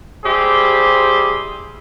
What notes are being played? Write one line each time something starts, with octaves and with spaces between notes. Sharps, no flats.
G3 E4 G4 G#4 C5